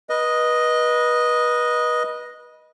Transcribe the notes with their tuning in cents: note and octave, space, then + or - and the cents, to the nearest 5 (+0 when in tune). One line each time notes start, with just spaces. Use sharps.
B4 -25 D#5 +0